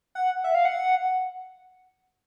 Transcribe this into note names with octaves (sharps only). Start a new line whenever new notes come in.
F#5
E5
F5
F#5